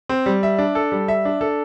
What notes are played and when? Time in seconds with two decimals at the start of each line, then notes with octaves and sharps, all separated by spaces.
0.09 C4
0.26 G3
0.43 E5
0.59 D4
0.75 A4
0.92 G3
1.08 E5
1.25 D4
1.41 A4